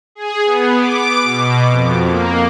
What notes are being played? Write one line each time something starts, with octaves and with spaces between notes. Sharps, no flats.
G#4
B3
D6
B2
F2
A#3